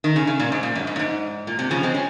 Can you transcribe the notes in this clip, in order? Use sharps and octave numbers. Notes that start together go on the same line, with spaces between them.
D#3
C#3
C#3
A#2
G#2
A#2
F#2
G#2
A#2
G#2
A#2
C3
C#3 F3
G#3 C4
C#4